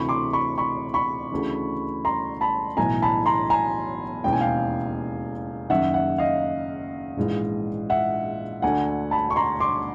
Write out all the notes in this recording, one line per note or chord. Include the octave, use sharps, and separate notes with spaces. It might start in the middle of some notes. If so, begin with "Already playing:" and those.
Already playing: D2 C3 E3 B5 C#6
C6 D6
B5 C#6
B5 C#6
B5 C#6
D2 C#3 E3
A#5 C6
A5 B5
B1 A2 E3 G#5 A#5
A5 B5
A#5 C6
G#5 A#5
E1 D#2 C#3 E3 G5
G#5
F5 G5
F#1 F#2 D#3 E5 F#5
E5 F#5
D#5 F5
A#1 G#2 E3
E5 F#5
D2 D3 F#5 G#5
A5 B5
C#6
A#5 C6
C6 D6